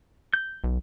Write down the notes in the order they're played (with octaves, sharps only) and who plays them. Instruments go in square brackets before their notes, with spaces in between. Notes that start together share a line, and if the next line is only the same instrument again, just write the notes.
[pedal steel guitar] G6
[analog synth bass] B1